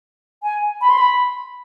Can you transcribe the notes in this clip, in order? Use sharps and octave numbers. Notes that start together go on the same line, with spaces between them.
G#5
B5
C6
B5